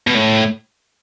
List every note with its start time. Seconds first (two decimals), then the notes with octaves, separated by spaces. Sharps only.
0.07 B2
0.15 A2